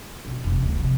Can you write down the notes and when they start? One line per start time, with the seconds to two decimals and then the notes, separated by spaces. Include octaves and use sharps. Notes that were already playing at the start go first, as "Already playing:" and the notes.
0.25 B1
0.44 F1 C2
0.62 D1
0.78 C3 F3